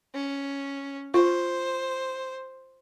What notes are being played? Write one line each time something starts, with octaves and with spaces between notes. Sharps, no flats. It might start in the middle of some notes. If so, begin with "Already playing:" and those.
C#4
F4 C5